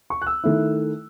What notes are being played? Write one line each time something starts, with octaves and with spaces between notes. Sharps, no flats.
C#6
F#6
E6
D#3 A3 E4